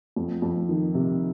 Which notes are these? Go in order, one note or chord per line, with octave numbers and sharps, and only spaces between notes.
F2
F2
D#3
C3